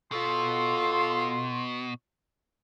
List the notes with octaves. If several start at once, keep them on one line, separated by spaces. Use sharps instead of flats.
B2 F4 A4 C6